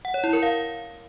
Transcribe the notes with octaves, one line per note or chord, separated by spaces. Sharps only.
F#5
C#5
E4
A#4
F5